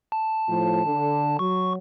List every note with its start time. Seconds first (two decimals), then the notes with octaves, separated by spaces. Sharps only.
0.12 A5
0.49 A2 F3
0.86 D3
1.39 F#3 C#6